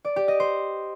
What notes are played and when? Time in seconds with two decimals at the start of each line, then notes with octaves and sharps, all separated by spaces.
0.05 D5
0.16 G4
0.28 D#5
0.40 C5